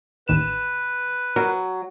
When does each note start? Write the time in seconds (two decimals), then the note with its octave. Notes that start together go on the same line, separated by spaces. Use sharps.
0.28 A1 D#2 B4 E7
1.36 F#3 A#4